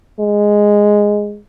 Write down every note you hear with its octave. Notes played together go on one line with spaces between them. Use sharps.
G#3